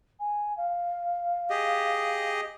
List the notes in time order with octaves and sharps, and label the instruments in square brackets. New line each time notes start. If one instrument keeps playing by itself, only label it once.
[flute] G#5
F5
[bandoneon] G4 G#4 D#5